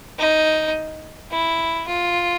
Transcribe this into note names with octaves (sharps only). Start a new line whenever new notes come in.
D#4
E4
F4